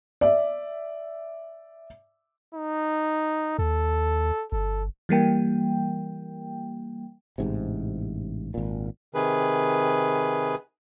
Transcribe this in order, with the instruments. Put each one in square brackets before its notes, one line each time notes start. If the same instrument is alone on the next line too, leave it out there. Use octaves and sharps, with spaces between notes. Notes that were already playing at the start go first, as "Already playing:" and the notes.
[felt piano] D5 E5
[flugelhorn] D#4
[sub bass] D#2 [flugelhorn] A4
[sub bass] G1 [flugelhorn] A4
[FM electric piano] E3 G3 A#3 G5
[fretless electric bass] A1 G#2 C3
G#1 A#2
[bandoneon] C3 D#3 G#4 B4